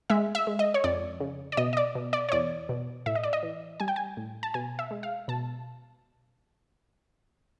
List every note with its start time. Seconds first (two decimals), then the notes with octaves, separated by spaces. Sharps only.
0.10 G#3 E5
0.35 E5
0.47 G#3
0.59 D#5
0.74 C#5
0.84 F2 D5
1.20 C#3
1.52 D5
1.57 B2 D#5
1.73 D#5
1.77 D5
1.95 B2
2.13 D5
2.29 C#5
2.32 E2 D5
2.69 B2
3.06 A2 E5
3.15 D#5
3.24 D5
3.33 D#5
3.43 E3
3.80 G3 G#5
3.88 G5
3.96 G#5
4.17 A2
4.43 A5
4.54 B2 G#5
4.79 E5
4.91 G#3
5.03 F5
5.28 B2 A5